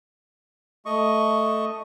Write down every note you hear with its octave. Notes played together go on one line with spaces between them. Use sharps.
A3 D#5 C#6